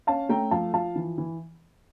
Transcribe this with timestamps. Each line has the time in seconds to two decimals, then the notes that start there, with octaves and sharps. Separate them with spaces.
0.07 C#4 F5 A5
0.29 A3 G5 A#5
0.51 F3 F5 A5
0.73 F3 F5 A5
0.95 E3
1.18 E3